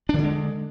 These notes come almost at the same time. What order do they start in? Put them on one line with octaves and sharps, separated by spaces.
D4 D#3 D3 G#3